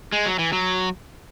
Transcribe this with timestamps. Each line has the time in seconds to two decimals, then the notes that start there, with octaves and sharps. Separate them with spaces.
0.12 G#3
0.26 F#3
0.39 E3
0.53 F#3